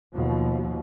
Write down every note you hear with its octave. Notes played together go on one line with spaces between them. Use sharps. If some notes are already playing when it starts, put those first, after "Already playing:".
D#2 B2 F3